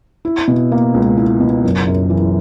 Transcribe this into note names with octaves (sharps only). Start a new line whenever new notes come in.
E4
B2
A#3
C#2
E4
B2
F#1
F#2
E3